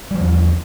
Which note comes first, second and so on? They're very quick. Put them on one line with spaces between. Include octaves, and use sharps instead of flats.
G3 F3 E2